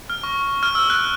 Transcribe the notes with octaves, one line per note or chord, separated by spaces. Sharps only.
F6
C#6
F6
E6
F#6